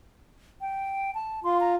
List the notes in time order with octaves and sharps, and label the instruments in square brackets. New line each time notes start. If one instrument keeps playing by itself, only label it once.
[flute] G5
A5
[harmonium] F4 [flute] C6
[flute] A#5